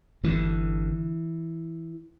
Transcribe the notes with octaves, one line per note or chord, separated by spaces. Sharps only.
G1 G2 D3 E3